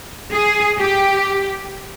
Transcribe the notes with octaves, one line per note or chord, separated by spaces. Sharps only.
G#4
G4